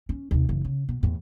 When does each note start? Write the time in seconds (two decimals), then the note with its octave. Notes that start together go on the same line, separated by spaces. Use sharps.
0.09 C#4
0.31 D#2 C3
0.49 F#1 E3
0.65 C#3
0.89 B2
1.03 E2 A2